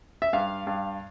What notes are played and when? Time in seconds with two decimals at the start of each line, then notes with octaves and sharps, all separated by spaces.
0.22 E5
0.33 G2 F5
0.67 G2